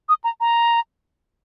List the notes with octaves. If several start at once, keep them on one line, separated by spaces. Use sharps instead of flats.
D#6
A#5
A#5